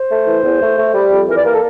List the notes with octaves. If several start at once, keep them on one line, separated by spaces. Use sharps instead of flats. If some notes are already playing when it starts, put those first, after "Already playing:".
Already playing: C5
A3
E3
E2
A3
A3
G3
F2
E3 A#4
D5
A#3 A#4
A4